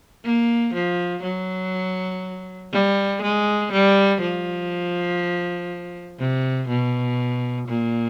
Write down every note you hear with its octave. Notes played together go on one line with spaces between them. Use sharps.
A#3
F3
F#3
G3
G#3
G3
F3
C3
B2
A#2